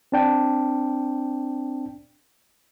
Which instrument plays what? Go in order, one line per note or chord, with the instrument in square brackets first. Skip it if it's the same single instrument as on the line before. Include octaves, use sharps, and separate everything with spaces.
[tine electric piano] C4 D4 G5